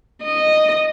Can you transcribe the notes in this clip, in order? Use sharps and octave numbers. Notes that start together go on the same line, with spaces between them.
D#5